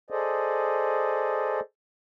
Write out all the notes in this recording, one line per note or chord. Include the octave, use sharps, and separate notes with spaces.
G#4 A4 C5 D5 D#5